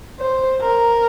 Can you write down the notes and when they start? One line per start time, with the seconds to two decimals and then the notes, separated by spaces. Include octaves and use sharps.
0.20 C5
0.61 A#4